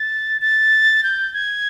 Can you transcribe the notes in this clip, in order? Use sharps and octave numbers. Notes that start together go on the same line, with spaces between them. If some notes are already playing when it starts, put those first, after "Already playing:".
Already playing: A6
A6
G6
G#6